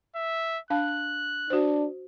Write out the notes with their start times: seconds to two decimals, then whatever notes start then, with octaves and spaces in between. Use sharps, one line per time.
0.16 E5
0.70 D4 F5 A5 F#6
1.50 D4 F#4 C5